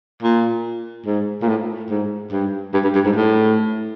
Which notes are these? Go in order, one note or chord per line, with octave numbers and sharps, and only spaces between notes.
A#2
G#2
A#2
A2
G#2
G2
G2
G2
G2
G#2
A2